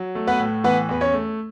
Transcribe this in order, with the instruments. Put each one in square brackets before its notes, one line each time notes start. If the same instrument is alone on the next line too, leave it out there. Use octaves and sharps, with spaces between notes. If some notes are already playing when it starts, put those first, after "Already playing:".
Already playing: [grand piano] F#3
A3
B3 B4
A2
E3 B3 B4
E2 B4
C#4 C#5
A3